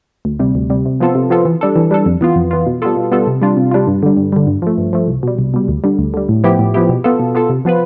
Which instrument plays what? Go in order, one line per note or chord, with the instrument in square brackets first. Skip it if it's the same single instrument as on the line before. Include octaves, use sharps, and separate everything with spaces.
[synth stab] D2
C3 G3
D2
C3 G3
C3
F3 B3 F4 A4
C3
F3 B3 F4 A4
E3
G3 D4 A4
E3
G3 D4 A4
F2
E3 B3 F4
F2
E3 B3 F4
B2
G3 B3 F4 A4
B2
G3 B3 F4 A4
C3
G3 D4 F4
C3
G3 D4 F4
G2
D3 G3
G2
D3 G3
G2
F3 A3
G2
F3 A3
C2
B2 G3
C2
B2 G3
D2
D3 G3
D2
D3 G3
A2
F3 B3 E4 G4
A2
F3 B3 E4 G4
B2
B3 F4 A4
B2
B3 F4 A4
C3
F3 B3 F4 B4